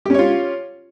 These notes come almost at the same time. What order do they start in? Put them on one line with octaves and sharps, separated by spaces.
G4 C#4 C#5 F4